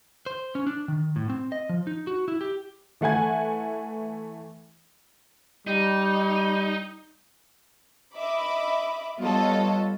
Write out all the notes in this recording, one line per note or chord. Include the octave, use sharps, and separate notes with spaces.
C5
C#4
D4
D#3
A2
C4
D#5
F3
D#4
F#4
E4
G4
E3 A3 F#5 G#5 G#6
G3 D#4
D#5 E5 B5 D6
G3 B3 F4 A4 C#5 D#5